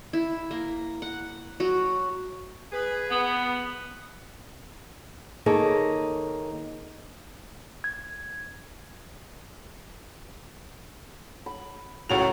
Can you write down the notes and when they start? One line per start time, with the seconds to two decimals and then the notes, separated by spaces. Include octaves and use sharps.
0.13 E4
0.51 A#3
1.02 F#5
1.60 F#3 F#4
2.73 G#4 B4
3.10 B3
5.46 D#3 A#3 D#4 G#4 A4 C#5
7.84 G#6
11.46 B5
12.09 C#2 A2 F#3 F7